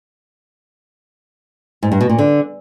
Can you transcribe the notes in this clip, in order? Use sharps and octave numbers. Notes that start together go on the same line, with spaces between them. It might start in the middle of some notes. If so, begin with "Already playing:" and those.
G#2
G2
B2
A#2
D3